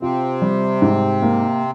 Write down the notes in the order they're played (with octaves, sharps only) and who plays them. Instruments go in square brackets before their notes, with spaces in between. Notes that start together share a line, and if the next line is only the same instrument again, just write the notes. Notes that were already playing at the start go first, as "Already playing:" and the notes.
[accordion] C3 C4 [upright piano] F4
[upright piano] G3
G#2
A#3